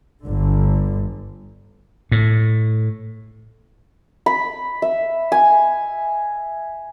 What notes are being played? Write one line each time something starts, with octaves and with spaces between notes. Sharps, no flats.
G1 D3
A2
B5
E5
G#5